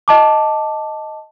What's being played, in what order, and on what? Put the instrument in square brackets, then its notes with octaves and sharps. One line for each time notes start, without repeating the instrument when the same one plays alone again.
[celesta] D#5 A5 D6